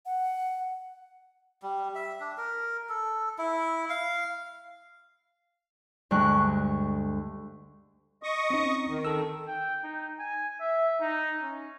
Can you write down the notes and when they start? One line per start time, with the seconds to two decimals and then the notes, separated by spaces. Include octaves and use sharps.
0.06 F#5
1.62 G3
1.95 E5
2.20 D4
2.38 A#4
2.89 A4
3.38 E4
3.90 F5
6.11 D2 G2 D3 G#3 C#6 F#6
8.23 D#5 C#6 D#6
8.50 C4 C#4 D#4
8.89 D#3
9.05 A4 E6
9.47 G5
9.84 D#4
10.19 G#5
10.61 E5
11.01 D#4
11.42 C#4